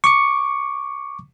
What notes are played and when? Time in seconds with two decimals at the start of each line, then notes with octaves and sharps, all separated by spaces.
0.04 C#6 D6 C#7